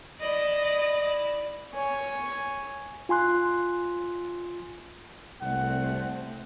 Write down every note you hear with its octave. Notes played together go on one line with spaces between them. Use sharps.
E4 D5 D#5
C#5 G#5
F4 G#5 C6 F#6
C2 A3 C4 F#5